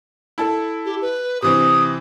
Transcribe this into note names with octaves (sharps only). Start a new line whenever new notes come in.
E4 A4
G4
B4
C3 E3 C4 D#6